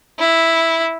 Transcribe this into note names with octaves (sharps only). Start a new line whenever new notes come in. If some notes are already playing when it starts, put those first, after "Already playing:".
E4